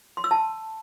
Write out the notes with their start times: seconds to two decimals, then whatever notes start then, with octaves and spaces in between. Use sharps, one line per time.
0.17 C6
0.24 E6
0.31 A5